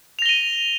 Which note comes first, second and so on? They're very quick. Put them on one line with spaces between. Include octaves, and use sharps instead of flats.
F7 A#6 G7 D#7